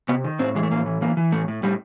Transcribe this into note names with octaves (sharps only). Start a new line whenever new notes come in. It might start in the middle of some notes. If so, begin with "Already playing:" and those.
C3 B3
D#3
A2 C4
E3 G#3
A3
A2 A#3
E3
E3 A#3
E3
A2 A3
A2
A2 G3